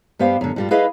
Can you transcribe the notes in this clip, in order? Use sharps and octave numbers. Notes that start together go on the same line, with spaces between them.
G2 B3 G4 C5 F5
F#2 D3
G2 G3 F4
E4 G#4 B4 D#5 F5